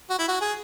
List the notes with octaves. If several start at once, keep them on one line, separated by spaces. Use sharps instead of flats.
F#4
E4
F#4
G#4